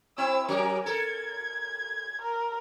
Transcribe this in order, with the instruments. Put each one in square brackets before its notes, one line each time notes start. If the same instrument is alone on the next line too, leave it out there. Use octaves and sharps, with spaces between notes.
[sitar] C4 E4 [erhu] E6
[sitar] F#3 C#4 A#4 [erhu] G#4
[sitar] A4 A#4 [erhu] G#6
[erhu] A#4